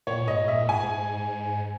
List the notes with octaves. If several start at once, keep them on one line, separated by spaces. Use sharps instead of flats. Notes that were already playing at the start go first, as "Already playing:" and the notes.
A#2 C#5
G#2 D#5
A#2 E5
G#2 G#5